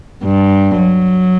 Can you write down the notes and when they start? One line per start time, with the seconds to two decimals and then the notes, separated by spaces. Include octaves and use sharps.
0.24 G2
0.77 F#3